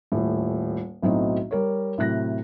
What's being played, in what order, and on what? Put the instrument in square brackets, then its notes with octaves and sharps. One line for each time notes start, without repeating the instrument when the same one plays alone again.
[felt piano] D#1 A2
B1 A2 F#3 C4 D#4 D#5
G3 A#4 C#5
A2 C3 F#3 F#6 A#6